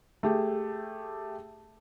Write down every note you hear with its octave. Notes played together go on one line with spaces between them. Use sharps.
A3 G4 G#4